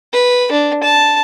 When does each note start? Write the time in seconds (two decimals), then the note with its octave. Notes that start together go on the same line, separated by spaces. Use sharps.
0.13 B4
0.51 D4
0.83 A5